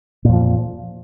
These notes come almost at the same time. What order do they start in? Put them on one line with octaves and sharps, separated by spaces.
A#2 F2 F3